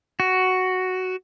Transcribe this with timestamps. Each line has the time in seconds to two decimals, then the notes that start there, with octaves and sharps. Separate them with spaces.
0.20 F#4